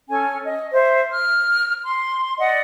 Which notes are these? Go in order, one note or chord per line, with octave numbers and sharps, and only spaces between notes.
C#4 A4 G#5
D#5
C5 E5
F6
C6
D5 D#5 F#5